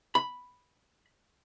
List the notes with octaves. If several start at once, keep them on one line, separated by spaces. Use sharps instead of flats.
B5